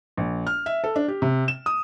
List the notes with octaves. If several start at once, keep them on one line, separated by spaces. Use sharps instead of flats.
A#1
F6
E5
A4
D4
G4
C3
E7
D#6